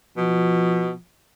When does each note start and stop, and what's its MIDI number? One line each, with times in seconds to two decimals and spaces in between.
0.17 0.91 47
0.17 0.99 53